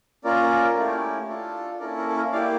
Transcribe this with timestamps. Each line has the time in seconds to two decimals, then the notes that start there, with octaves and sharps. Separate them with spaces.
0.24 A#3 C#4 F4 A#4 D5
0.76 A3 C#4 E4 G4
1.28 D4 F4 A4
1.80 A#3 C#4 E4 A4 A#4 D5
1.98 A#4
2.08 A4
2.16 A#4
2.32 A#3 E4 G4 D5 F5